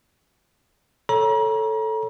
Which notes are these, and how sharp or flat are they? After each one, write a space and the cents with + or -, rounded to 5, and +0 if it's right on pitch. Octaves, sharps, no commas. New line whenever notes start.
A4 +0 C#5 +0 A#5 +35